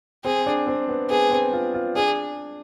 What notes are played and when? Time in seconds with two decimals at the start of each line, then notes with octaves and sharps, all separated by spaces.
0.24 C4 G#4
0.46 D4
0.67 C4
0.88 B3
1.10 B3 G#4
1.31 C4
1.53 F4
1.74 F4
1.95 D4 G#4